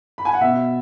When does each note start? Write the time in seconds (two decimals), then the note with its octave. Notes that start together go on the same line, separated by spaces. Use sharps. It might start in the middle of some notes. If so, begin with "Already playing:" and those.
0.18 B5
0.25 G#5
0.33 F#5
0.41 B2 B3 F#4 E5